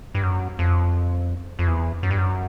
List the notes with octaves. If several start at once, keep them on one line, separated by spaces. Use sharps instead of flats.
G2
F#2
F2
F2
E2
F#2
G2
F#2